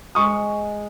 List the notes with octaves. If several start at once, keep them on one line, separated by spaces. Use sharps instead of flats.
G#3 C#6 D#6